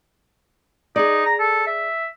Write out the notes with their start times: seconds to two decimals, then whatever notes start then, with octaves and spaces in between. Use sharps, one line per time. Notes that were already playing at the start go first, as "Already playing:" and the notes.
0.96 D#4 G#4 D5
1.26 A#5
1.39 A4
1.67 E5